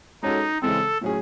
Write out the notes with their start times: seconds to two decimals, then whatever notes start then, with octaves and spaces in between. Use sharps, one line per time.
0.23 G#3 C#4 D#4 F#4 A4
0.62 C#3 E3 G#3 C4 A4
1.01 A2 F#3 C#4 G#4